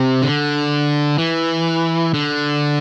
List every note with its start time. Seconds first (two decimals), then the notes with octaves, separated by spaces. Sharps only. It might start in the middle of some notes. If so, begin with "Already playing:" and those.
Already playing: C3
0.22 D3
1.18 E3
2.14 D3